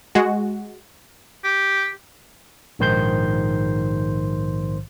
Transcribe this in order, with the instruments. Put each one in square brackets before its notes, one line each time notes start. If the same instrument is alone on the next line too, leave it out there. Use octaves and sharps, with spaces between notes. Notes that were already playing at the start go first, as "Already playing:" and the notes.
[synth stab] G#3 F#4
[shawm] G4
[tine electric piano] A#1 G#2 D#3 C5 C6 G6